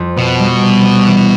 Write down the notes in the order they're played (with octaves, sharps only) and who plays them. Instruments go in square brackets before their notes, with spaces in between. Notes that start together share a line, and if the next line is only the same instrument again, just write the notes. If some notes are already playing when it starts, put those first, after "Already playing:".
Already playing: [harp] F2
[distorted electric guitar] B2 [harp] B3
[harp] G3
C3
G3
E3